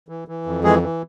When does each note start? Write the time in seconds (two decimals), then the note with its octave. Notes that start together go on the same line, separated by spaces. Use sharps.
0.09 E3
0.28 E3
0.46 F2
0.64 E3 G#3 G#4
0.82 E3